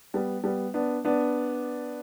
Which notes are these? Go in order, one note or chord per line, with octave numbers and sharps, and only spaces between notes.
G3 B3
G3 B3
B3 D4
B3 D4